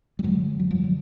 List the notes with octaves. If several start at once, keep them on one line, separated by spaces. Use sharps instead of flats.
G3
F#2 D3 F#3 G#3
F#3
F#2 D3 F3 G3
F#3